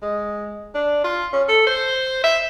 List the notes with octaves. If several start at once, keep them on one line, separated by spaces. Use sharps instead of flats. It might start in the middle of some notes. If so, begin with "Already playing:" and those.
G#3
D4
F4
C#4
A4
C5
E5